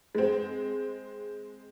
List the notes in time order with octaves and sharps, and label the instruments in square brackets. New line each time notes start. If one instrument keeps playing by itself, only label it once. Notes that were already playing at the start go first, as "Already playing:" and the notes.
[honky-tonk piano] G#3 C4